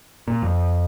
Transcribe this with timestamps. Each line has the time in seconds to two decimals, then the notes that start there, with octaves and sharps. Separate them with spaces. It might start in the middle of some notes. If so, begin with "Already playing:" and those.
0.28 A#2
0.42 F2